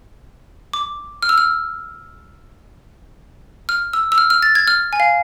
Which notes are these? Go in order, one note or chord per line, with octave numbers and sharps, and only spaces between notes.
D6
F6
E6
F6
F6
E6
E6
F6
F6
A6
G#6
F6
G#5
F5